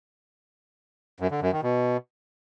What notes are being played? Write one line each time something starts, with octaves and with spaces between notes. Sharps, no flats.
F#2
D3
F#2
D#3
B2